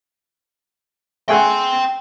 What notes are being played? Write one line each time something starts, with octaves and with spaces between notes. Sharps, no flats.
A3 G#4 F#5 G5 C6